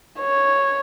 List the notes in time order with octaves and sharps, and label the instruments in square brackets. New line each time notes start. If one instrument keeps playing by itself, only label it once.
[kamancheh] C#5